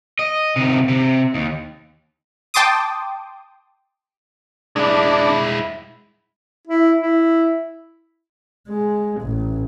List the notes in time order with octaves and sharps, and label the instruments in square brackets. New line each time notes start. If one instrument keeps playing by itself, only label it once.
[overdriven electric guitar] D#5
C3 D#3
C3
D#2
[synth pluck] G5 A5 C6 D6 D#6
[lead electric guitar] G#3 E4 [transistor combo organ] D4
[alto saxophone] E4
E4
[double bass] G#3
A1